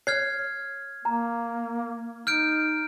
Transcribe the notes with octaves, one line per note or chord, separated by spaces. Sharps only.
C#5 F6 G#6 C7
A#3 A#5
D#4 F6 G6 D7